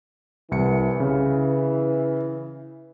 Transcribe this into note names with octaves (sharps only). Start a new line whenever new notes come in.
C2 E3 C#7
C#3